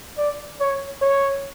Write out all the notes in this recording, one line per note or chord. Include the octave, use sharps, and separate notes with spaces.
D5
C#5
C#5